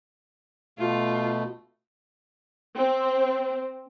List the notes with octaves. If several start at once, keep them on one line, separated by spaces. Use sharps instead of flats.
B2 A3 F4
C4